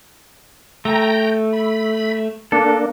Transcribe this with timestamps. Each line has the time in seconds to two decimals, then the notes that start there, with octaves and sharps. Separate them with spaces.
0.85 A3 G5 A#5
1.53 B5
2.52 A#3 D4 A4